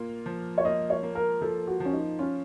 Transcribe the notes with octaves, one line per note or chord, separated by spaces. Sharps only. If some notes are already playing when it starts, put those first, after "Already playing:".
Already playing: A#2 A#3 F4
F3
C#5
A#3 D#5
C#5
A#3
A#4
F3 A4
F#4
F3
C#4
D#4
C#4 F4